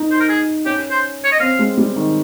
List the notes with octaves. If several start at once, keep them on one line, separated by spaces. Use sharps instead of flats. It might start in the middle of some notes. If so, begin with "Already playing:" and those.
Already playing: D#4
C5
A#4
G#4
C#4 G4
C5
C#5
D#5
C4 F5
G#3
G3
D#3